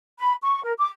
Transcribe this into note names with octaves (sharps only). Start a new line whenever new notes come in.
B5
C#6
A#4
D6